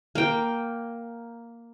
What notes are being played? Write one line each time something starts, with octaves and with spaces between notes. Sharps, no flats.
A#3 G5